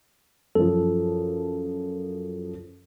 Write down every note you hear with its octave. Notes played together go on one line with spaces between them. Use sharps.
F#2 F3 A4